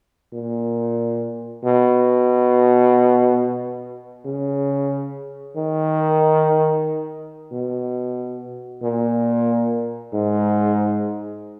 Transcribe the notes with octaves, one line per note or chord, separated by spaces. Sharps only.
A#2
B2
C#3
D#3
B2
A#2
G#2